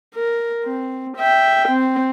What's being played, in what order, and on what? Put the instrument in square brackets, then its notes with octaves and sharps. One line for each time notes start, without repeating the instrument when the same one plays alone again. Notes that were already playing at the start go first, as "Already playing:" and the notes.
[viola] A#4
C4
E5 G5
C4